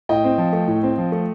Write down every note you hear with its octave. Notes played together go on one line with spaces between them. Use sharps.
A2 D#5 G5
C4
F3
A3
A2
C4
F3
A3